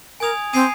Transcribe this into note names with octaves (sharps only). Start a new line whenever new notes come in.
A#4 G#5 D#6 G#6 F7
C4 G#5 D#6 C7 D#7